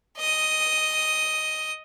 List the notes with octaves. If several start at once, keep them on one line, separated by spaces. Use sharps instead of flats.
D#5 D#6